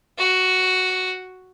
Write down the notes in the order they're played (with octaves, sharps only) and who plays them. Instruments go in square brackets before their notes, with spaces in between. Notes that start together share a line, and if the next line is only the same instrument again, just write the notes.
[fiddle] F#4